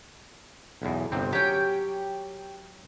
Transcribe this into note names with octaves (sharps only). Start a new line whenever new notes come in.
B1 E2
G1 C3 C4
F#3 C#4 G4 G5